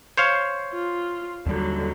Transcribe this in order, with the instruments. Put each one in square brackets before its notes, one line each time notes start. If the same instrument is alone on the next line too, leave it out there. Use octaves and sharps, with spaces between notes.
[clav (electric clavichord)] C5 C#5 F5
[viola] F4
[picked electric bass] D#2 G3 [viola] D3 F#3